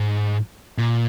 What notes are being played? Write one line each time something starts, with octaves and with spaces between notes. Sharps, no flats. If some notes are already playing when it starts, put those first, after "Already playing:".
Already playing: G#2
A#2